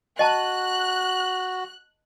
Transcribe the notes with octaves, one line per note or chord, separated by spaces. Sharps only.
F#4 D#5 A5 A#5 F#6